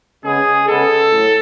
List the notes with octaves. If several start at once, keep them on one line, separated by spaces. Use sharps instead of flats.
C#3 G#3 B3 G#4
C#3 G#3 B3 A4
A2 F#3